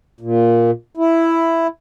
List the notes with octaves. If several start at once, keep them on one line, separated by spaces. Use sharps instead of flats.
A#2
E4